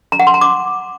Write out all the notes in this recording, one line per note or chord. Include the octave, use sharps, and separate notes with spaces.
A#5
F#5
C6
A#5
D6